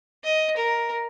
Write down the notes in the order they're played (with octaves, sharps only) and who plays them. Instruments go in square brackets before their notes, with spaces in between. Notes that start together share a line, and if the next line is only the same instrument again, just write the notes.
[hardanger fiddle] D#5
A#4